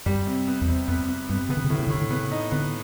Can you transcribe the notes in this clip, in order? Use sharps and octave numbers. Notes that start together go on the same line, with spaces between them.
F#2 G3
C3
B3
E2
C3
F2 B3
B3
G2 B3
C#3 B3
D3
C#3
A2 D3
C#3
D3
A2 C#3
D3
C#3 B3
D#4
D3 B3